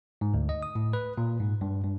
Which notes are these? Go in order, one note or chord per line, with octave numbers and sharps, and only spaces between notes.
G#2
D2
D#5
D#6
A2
B4
A#2
G#2
G2
G2